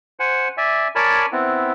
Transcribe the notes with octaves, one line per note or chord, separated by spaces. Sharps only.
C5 F#5 G#5
D5 E5 G#5
A#4 C#5 D5 G#5 A5 B5
B3 C4 E4